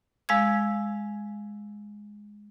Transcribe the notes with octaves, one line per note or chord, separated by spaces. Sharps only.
G#3 F5 E6 G#6